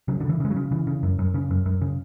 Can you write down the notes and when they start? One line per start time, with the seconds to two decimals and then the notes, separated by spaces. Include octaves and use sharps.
0.08 C#3 F#3
0.20 D3
0.24 C#3
0.29 E3
0.40 C#3 G#3
0.50 F#3
0.56 C#3
0.71 C#3 E3
0.87 C#3
1.03 F#2
1.19 F#2
1.34 C#3
1.51 F#2
1.66 F#2
1.81 C#3